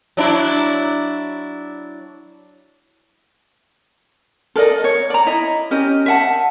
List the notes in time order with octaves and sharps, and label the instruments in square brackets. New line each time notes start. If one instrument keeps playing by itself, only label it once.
[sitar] F#3 D4 E4
[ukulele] A4 A#4 D5 D#5
C#5
D5 A#5
E4 D#5
C#4 G4 D#5
E5 F#5 A5